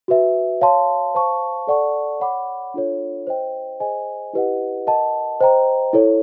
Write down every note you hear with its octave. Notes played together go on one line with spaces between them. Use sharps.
F#4 B4 E5
C#5 F5 A5 C6
C5 F5 A5 C#6
A4 D5 F#5 A5 C#6
C#5 F#5 B5 D6
D4 F4 A4 C#5
C5 D#5 G5
G#4 C5 D#5 G#5
E4 G4 B4 D#5 F#5
A#4 D#5 F#5 A5
C5 D#5 G5 A#5
E4 A4 C#5